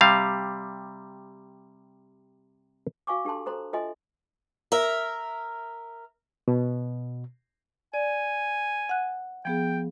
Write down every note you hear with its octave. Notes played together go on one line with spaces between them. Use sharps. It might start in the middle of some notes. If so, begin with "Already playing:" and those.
C3 G3 F5
F#4 F5 G#5 C#6 D6
D4 G4 A4 A5 C6
A4 C5 A#5 C6
F4 A4 D#5 E5 G#5 C6
A#4 E5
B2
D5 G#5
F#5 F#6
F3 B3 G#4 G5